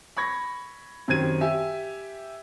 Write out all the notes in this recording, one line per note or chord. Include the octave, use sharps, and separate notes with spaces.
B5 C#6 G#6 A#6
F#2 D#3 C4 G4 G#6 D#7
G4 E5 G#5